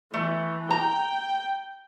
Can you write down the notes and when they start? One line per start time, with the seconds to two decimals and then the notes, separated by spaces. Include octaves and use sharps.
0.14 E3 A3
0.71 G5 A#5